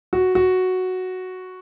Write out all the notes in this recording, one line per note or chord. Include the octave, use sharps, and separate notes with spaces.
F#4
F#4